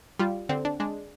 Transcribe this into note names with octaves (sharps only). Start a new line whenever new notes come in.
G3 F4
D3 C4
D4
G#3 D4